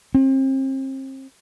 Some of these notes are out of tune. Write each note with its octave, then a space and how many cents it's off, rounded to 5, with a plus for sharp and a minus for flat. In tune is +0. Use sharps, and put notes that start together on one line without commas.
C4 +35